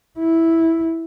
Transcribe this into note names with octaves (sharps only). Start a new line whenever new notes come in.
E4